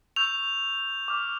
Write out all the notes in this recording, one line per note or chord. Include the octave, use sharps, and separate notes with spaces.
C#6 E6 G6 F7
D6 F6